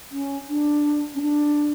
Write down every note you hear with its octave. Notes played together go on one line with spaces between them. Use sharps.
C#4
D4
C#4
D4